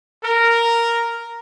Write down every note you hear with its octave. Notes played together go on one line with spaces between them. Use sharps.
A#4